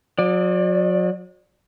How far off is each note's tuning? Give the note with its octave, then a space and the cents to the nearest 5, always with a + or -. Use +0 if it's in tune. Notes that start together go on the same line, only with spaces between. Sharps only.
F#3 -35 D5 +20